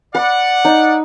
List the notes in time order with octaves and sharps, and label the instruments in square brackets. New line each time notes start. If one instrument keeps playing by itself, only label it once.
[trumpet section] D5 F#5 [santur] B5
[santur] D#4